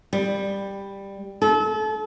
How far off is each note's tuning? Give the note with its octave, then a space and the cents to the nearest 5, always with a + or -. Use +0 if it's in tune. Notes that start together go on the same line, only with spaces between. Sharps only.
G3 +10
A4 -35